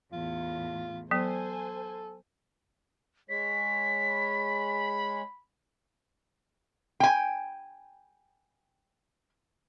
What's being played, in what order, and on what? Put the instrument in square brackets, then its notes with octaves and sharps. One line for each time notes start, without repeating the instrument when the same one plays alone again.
[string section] E2 A2 [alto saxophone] F4
[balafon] F#3 B3 [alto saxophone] A4 [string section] C5 G#5
[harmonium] G#3 C#5 [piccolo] B6
[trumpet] B5
[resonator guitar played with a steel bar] G5 G#5